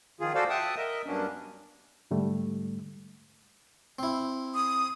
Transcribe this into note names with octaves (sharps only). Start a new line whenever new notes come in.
D#3 F3 F4 G#4
F4 F#4 A4 C5 D5 F5
E5 F#5 G5 A5 D#6
A#4 D#5 E5
G2 F#3 A#3 B3 C#4 D4
G#2 D3 G3 A3
C4 E4
D#6